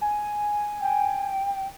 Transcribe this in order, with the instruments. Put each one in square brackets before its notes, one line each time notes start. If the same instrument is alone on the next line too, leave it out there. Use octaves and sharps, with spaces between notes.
[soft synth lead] G#5
[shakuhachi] G5